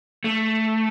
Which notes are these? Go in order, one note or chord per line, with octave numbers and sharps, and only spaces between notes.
A3